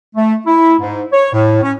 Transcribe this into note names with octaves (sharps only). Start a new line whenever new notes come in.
A3
E4
G#2
C#5
A2
C#4